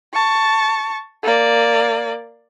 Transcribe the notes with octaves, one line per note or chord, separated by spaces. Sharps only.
A5 C#6
A#3 D5